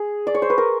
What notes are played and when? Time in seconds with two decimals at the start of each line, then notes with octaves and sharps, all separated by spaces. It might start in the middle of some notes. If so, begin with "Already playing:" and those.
Already playing: G#4
0.27 D5
0.35 C#5
0.42 C5
0.50 B4
0.58 A#4